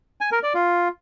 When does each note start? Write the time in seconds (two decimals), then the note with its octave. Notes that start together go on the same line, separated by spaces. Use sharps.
0.21 G#5
0.32 A#4
0.43 D5
0.55 F4